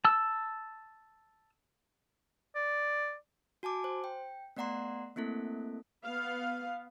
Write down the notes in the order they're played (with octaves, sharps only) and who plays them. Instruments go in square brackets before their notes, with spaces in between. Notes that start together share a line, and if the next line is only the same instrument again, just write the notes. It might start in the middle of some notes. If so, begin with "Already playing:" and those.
[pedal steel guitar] A5 E6
[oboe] D5
[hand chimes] F#4 G#5 A5 D6
C5
G5
A3 B3 D5 F#5 A#5 C6
A3 A#3 C4 E4 A4
[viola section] B3 F5